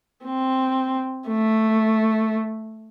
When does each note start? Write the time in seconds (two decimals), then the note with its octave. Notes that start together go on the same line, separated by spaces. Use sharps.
0.25 C4
1.28 A3